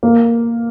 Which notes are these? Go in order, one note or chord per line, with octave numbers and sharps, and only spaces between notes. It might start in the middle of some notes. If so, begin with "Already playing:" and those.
A#3